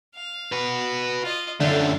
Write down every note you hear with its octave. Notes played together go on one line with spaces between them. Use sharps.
F5
F#4 B4
F4 D#5
F#2 D3 A3 F4